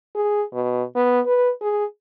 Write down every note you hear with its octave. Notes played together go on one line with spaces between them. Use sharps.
G#4
B2
B3
B4
G#4